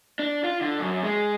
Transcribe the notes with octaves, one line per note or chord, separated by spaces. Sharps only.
D4
F4
D3
F#2
G#3